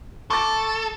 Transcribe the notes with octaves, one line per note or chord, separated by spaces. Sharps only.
A4 C#6 D6 A6